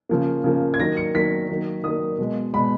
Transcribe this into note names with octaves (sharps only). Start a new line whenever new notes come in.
C#3 F3 A#3
C#3 F3 A#3
G#6
D#3 F#3 A#3 A#6
C#7
D#3 F#3 A#3 B6
D#3 F#3 A#3
D#3 F#3 A#3 D#6
B2 G#3
B2 G#3 B5